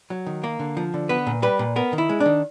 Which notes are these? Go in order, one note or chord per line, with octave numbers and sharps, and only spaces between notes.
F#3
D#3
A#3
D3
F3
D3
B3 B4
A#2
G3 B4
A#2
B3 A#4
D#3
E4
G#3
D4
D#3